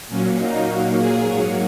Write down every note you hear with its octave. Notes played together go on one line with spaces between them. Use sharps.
A#2 F#3 A#3 C#4
D#4
A#2 F#3 A#3 F#4
G#4
G#2 F#3 A#3 C#5